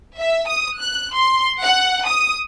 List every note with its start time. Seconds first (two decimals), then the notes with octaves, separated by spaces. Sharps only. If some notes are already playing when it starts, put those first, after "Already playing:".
0.19 E5
0.47 D#6
0.80 F#6
1.15 C6
1.62 F#5
2.07 D#6